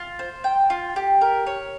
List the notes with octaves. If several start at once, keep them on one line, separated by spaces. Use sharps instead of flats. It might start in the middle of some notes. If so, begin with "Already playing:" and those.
Already playing: F4
C5
G5
F4
G4
A#4
C#5